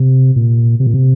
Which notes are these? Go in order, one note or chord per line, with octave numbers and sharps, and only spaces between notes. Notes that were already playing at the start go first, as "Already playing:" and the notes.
Already playing: C3
A#2
C3
A#2
C3